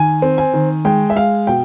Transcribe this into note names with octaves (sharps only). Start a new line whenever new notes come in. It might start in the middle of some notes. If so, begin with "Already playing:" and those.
Already playing: D#3 G#5
C4
G#5
D#3
G#3 G5
E5
G#3 F5
B2 G5